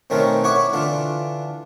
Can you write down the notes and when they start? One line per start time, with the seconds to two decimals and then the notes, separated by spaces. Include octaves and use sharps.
0.10 B2 D#3 A3 C4 C#4 A#4
0.44 E4 F#4 C#5 F#5 C#6 D6
0.73 D3 E3 D4 F4